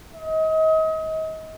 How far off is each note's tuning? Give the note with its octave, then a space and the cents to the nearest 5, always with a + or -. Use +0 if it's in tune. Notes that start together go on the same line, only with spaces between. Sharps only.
D#5 +35